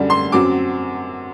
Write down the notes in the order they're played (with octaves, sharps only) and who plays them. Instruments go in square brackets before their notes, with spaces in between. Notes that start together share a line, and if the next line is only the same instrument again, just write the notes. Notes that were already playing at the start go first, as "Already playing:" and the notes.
Already playing: [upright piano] F#2 D3 G3
C6
F#2 F#3 C4 D6